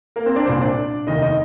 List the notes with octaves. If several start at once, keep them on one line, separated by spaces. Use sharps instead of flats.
A#3 A#4
C4 C5
D4 D5
C2 A#2 C4 C5
D4 D5
F1 D#2 D#3 D#4 D#5
D#4 D#5